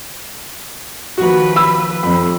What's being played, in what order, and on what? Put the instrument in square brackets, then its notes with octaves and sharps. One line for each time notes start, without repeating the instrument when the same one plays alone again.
[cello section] D#2 F3 B4 [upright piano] F#4
[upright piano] B5 E6
[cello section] F2 [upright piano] B5